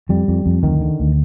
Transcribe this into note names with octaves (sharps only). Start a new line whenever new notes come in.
F2 G3
F2
F2
D2 D#3
D3
D2